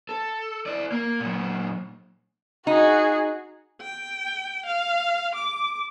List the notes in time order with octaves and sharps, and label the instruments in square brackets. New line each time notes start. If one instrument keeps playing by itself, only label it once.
[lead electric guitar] A4
E4 D5
A#3
A#2 F#3
[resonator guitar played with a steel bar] D#4 [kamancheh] F#4 G#4
[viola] G5
F5
D6